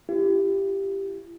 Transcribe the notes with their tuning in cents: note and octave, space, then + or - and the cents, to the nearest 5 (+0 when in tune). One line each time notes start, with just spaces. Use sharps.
E4 +45 G4 +0